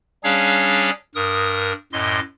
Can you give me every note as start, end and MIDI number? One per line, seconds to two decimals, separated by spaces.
0.24 0.90 55
0.24 0.90 61
0.24 0.90 62
0.24 0.90 68
0.24 0.90 73
0.24 0.90 77
1.15 1.73 43
1.15 1.73 70
1.15 1.73 87
1.93 2.20 42
1.93 2.20 45
1.93 2.20 75
1.93 2.20 84